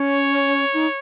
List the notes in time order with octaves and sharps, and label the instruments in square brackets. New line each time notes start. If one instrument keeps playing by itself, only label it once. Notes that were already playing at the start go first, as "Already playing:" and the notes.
Already playing: [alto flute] C#4 [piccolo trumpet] C#5
[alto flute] D#4